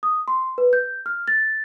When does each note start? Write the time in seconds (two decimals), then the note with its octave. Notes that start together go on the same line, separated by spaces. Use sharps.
0.03 D#6
0.28 C6
0.58 B4
0.73 G6
1.06 F6
1.28 A6